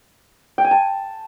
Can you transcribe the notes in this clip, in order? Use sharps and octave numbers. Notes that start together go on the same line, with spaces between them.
G5
G#5
A5